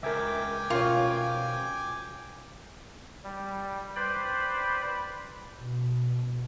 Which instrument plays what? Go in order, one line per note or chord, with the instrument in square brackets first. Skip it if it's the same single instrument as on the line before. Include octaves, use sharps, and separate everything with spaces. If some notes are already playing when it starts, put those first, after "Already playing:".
[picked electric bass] C#2 [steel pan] A#4 E5 [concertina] G5 G#5 D6
[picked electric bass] B2 C#4 [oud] F4 [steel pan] A#4 C#5
[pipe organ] G3
B4 C5 D5 G5 B5
[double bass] B2